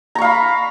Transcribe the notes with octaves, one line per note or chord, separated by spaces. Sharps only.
F5 A#5 B5 C#6